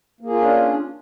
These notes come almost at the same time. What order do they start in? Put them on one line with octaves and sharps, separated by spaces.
A#3 G#4 F4 C#4 D4